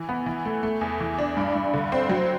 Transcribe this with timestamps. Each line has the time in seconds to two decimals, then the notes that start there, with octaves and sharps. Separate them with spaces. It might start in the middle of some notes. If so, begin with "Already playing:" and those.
Already playing: E3
0.09 B3
0.26 E3
0.45 A3
0.63 A3
0.81 E2
1.00 E3
1.18 D4
1.37 G2
1.55 G2
1.74 D3
1.92 C4
2.09 F#3